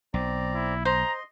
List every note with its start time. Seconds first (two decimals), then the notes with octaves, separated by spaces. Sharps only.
0.14 B1 C4 D5 A#5
0.54 E4
0.85 C5 D#5 A#5 C6